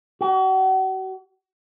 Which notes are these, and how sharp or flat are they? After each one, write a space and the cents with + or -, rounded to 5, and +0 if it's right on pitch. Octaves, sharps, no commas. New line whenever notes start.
F#4 +40